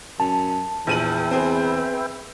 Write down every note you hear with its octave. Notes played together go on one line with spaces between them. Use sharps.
F#2 A5
A#1 E2 B4 E5 G5 D#7 F#7
C4 G#4